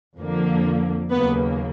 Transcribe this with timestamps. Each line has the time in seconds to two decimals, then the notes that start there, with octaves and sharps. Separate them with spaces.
0.18 F2 D3 F3 A#3
1.11 D#2 C#3 F#3 A#3 B3 B4